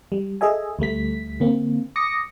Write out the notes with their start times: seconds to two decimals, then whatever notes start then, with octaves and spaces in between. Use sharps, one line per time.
0.12 G3
0.41 G#4 A4 D#5 E5 G#5
0.79 D2 G3 A3 B6
1.40 D3 A#3 C4
1.96 D6 D#6 A#6 C#7